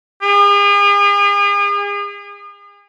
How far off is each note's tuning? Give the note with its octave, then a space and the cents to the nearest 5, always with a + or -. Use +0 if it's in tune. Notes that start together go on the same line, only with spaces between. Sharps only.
G#4 -40